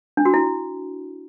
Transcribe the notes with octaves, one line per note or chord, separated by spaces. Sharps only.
D4
F#4
E4